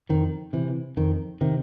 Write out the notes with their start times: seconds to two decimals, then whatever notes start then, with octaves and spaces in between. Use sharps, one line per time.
0.09 F2 D#3
0.53 C3 E3
0.97 F2 D#3
1.41 C3 D#3